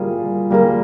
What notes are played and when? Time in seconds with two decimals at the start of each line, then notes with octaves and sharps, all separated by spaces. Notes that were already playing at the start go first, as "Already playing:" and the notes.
Already playing: G3 A#3 F4 G#4
0.51 G3 A#3 F4 G#4